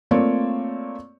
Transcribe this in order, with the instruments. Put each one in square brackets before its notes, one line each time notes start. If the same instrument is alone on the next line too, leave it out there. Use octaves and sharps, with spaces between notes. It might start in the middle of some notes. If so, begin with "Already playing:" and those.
[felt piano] A3 A#3 C4 F4 C#5 D5